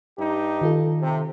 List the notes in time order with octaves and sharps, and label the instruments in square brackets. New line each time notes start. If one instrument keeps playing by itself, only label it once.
[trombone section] G2 D#4 G4
[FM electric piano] D#3 F4 A4
[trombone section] C3